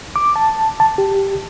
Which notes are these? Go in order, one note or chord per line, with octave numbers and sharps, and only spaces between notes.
D6
A5
A5
G4